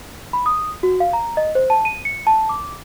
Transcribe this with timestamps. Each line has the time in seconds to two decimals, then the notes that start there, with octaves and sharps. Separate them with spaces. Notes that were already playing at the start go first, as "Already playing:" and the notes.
0.33 B5
0.46 D#6
0.83 F#4
1.00 F5
1.13 A#5
1.37 D#5
1.55 C5
1.70 A5
1.85 D#7
2.05 C#7
2.27 A5
2.49 D6